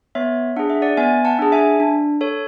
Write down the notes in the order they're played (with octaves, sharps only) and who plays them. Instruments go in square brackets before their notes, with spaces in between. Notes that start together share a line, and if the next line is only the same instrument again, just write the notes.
[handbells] B3 C#5 E5
D4 G#4 F#5
E5
D5 F#5
B3 E5 G#5
F#5 A5
D4 G#4
E5 G#5
D4
A4 C#5